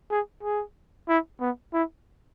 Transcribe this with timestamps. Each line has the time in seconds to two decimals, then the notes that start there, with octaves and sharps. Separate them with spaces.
0.11 G#4
0.43 G#4
1.09 E4
1.41 B3
1.73 E4